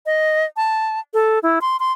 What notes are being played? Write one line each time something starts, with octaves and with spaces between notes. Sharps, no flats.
D#5
A5
A4
E4
C6
C6